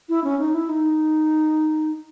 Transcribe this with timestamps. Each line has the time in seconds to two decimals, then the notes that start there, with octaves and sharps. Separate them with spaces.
0.09 E4
0.24 C#4
0.40 D#4
0.54 E4
0.69 D#4